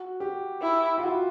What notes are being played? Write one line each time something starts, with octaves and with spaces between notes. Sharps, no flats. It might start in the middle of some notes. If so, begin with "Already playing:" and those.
Already playing: F#4
G4
E4
F4
F#4